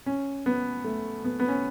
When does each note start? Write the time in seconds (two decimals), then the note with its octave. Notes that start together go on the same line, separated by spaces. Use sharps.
0.06 C#4
0.46 B3
0.84 A3
1.24 B3
1.40 B3
1.48 C#4